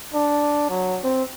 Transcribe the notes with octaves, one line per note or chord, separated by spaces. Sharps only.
D4
F#3
C4